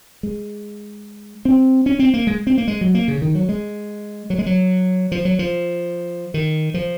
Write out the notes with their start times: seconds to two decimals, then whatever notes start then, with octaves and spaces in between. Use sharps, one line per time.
0.23 G#3
1.45 C4
1.86 C#4
1.99 C4
2.14 A#3
2.27 G#3
2.47 C4
2.58 A#3
2.68 G#3
2.81 F#3
2.95 A#3
3.08 C#3
3.22 D#3
3.35 F#3
3.49 G#3
4.30 F#3
4.38 G#3
4.46 F#3
5.12 F3
5.25 F#3
5.39 F3
6.34 D#3
6.74 F3